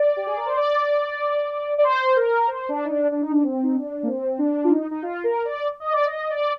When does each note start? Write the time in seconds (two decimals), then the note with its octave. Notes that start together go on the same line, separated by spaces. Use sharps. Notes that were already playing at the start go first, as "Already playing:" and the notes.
Already playing: D5
0.17 G4
0.27 G#4
0.37 A#4
0.46 C5
0.57 D5
1.78 D5
1.84 C5
2.16 A#4
2.48 C5
2.69 D4
2.85 D#4
2.90 D4
3.12 D4
3.22 D#4
3.31 D4
3.44 C4
3.63 D#4
3.75 D4
4.03 A#3
4.07 C4
4.38 D4
4.64 F4
4.70 D#4
4.91 D#4
5.03 F4
5.24 A#4
5.45 D5
5.80 D#5
5.92 D5
6.06 D#5
6.30 D5